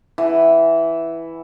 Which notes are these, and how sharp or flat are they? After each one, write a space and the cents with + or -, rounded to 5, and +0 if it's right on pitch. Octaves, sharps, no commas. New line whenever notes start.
E3 +0 F#5 +25